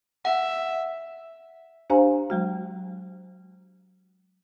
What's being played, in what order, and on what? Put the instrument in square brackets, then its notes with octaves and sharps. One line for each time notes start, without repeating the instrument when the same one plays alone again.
[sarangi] E5 [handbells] F#5
[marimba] D4 G4 C5 F5 G#5 A#5
F#3 G#3 F#4